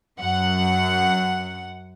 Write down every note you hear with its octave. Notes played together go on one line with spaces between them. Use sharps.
F#2 F#5